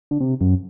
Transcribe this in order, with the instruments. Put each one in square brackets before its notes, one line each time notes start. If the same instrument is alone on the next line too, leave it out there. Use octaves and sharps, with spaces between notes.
[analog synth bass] D3
C3
F#2